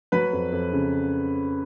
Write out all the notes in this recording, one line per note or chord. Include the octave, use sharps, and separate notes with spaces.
F#3 B4 B5
F2
F2
C#3